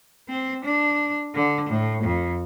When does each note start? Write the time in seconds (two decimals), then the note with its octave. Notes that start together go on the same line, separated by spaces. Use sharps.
0.28 C4
0.64 D4
1.34 D3
1.69 A2
2.04 F2